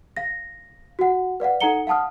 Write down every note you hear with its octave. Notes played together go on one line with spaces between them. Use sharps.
F5 A#6
F#4 F#5
B4 D5 F5 F#5
D#4 A4 F#5 A#5 C#7 G7
F5 F#5 A5 D#6 F6